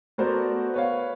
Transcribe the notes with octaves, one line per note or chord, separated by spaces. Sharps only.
A3 B3 F#4 A#4 C5 D5
B4 C#5 F5